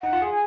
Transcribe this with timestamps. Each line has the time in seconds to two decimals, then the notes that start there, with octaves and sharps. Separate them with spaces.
0.03 D#4 F#5
0.13 F4
0.22 G#4
0.31 G#5